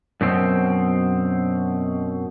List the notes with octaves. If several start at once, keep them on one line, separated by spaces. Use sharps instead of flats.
F#2 B2 C4